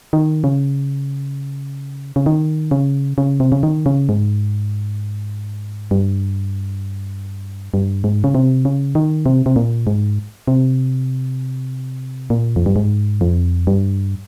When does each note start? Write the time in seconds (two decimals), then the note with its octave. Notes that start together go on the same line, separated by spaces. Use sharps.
0.13 D#3
0.44 C#3
2.16 C#3
2.26 D#3
2.71 C#3
3.18 C#3
3.40 C3
3.52 C#3
3.63 D#3
3.86 C#3
4.09 G#2
5.91 G2
7.74 G2
8.04 G#2
8.24 C#3
8.35 C3
8.65 C#3
8.95 D#3
9.26 C3
9.46 C3
9.56 A#2
9.87 G#2
10.48 C3
12.30 A#2
12.56 F2
12.66 G2
12.76 G#2
13.21 F2
13.67 G2